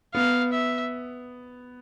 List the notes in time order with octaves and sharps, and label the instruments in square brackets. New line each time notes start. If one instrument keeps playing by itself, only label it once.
[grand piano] B3 [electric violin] F5
[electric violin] E5